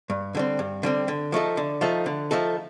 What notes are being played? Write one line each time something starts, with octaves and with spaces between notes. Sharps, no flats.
G2
D3 G3 C4
G2
D3 G3 C4
D3
F3 A3 D#4 A4
D3
F3 A3 D#4 A4
D3
F3 A3 D#4 A4